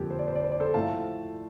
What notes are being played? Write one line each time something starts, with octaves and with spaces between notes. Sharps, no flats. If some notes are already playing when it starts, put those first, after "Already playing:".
Already playing: F2 D3 G3 A#3 G4
C5
D5
C5
D5
C5
D5
A4 C5
A2 F3 A3 F5 A5